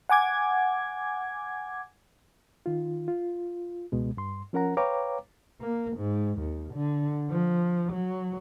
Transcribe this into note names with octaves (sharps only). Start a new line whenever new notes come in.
F#5 G#5 D6 G#6
D#3 F4
F4
C#2 B2 G#3
G2 C6
F3 C#4 A#4 F#5 A#5
B4 C#5 F5 G5 A#5 D6
A#3
G#2
D#2
D3
F3
F#3